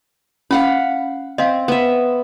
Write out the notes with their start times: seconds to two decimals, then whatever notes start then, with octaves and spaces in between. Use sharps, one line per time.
0.51 C#4 F5 F#5 B5
1.38 C4 D#5 F5
1.68 B3 E5